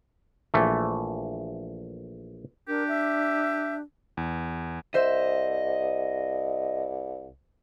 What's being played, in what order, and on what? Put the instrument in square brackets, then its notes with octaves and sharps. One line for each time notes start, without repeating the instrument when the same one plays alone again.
[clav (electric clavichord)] A#1 E3 A3
[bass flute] D4 [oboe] G4 [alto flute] A#4
[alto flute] E5
[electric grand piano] E2
[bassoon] C2 [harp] C5 E5 [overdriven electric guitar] D#5